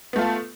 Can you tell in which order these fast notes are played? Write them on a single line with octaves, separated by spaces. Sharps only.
B3 A3 F4 A4